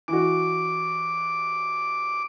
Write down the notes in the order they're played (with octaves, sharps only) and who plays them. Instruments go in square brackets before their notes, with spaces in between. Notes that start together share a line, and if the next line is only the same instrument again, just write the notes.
[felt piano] E3 F#4 [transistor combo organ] D6